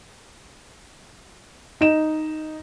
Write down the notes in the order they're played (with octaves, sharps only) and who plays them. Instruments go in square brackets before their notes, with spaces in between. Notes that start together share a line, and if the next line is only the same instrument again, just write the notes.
[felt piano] D#4 E7